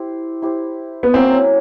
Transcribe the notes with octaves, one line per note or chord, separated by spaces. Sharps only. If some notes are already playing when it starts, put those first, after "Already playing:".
Already playing: E4 G4 C5
E4 G4 C5
B3
F#3 A#3 C4 C#4 E4